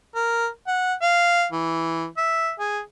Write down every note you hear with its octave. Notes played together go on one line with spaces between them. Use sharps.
A#4
F#5
F5
E3
E5
G#4